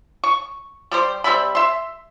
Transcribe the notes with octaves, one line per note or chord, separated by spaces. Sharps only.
C#6
G3 G4 C5
G3 C4 E5 B5
E5 C6